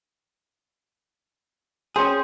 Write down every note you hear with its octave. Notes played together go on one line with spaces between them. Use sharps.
C#4 G#4 C5 G5